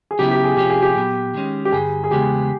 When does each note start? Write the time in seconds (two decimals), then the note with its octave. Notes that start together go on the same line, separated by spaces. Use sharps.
0.11 G#4
0.19 C#3 F#3 B3 E4 G4
0.31 G4
0.44 G#4
0.56 C3 F3 A#3 C#4 F4 G4
0.70 G#4
0.82 G4
0.96 A#2 F#3 B3
1.34 D#3 G#3 C#4
1.65 G4
1.72 G2 D3 G3 G#4
2.04 G#4
2.11 E2 C#3 G#3 B3 G4